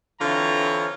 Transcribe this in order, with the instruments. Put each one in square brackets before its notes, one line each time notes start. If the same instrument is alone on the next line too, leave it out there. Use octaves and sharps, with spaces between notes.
[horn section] D3 E3 C4 F4 C#5 A#5